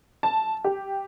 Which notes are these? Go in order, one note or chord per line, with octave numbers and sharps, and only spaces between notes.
A5
G4